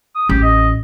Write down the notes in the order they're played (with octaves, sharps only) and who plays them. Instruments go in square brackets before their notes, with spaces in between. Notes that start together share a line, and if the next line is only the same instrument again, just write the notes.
[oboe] D#6
[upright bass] A1 [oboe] G4
[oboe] D#5